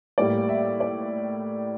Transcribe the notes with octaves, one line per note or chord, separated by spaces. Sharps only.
A2 G3 A#3 D5
E5
D5